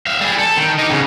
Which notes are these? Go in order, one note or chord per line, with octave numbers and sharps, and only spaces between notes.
E5 F5
G3 G#4
A4
D#3
D#4 G4
G#2 C#3